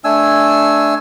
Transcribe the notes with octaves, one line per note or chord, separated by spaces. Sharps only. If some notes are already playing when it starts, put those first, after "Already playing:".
A3 D4 G#5 E6